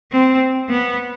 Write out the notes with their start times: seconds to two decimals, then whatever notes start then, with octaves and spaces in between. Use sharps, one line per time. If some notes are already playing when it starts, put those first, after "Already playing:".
0.12 C4
0.70 B3